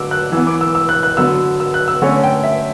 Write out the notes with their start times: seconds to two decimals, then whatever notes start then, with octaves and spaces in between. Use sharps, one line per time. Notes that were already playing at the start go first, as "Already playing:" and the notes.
Already playing: D3 F#3 D6 E6
0.11 F#6
0.32 E3 E6
0.37 B3
0.47 D6
0.61 E6
0.75 E6
0.89 F#6
1.03 F#6
1.17 D3 F#3 B3 E6
1.60 E6
1.74 F#6
1.88 E6
2.02 D3 A3 C#4 C#6
2.24 G5
2.44 E5